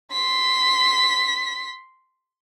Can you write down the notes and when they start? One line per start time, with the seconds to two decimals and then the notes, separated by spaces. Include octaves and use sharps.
0.12 C6 B6